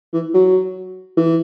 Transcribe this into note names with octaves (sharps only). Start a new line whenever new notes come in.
E3
F#3
E3